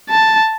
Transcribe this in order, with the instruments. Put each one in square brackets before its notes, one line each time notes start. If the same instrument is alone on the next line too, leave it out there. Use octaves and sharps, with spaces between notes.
[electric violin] A5